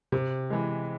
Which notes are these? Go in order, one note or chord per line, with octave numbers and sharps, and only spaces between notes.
C3
E3 G#3